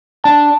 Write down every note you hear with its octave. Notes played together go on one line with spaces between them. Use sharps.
D4 A5